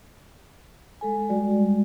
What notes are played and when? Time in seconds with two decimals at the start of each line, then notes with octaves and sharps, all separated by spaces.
1.01 G#3 A4 G#5
1.29 G3 G#3 F#4 D5